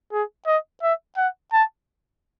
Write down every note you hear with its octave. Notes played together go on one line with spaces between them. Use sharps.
G#4
D#5
E5
F#5
A5